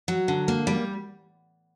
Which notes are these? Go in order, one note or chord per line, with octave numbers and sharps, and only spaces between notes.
F#3
D3
A#3
G3